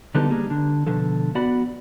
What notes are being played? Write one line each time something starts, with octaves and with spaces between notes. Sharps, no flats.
D3 F#3 G3 B3 D#4 A4
G3 A#3 G#4
D3
B2 D3 F3 A4
B3 F#4 D5 F#5 B5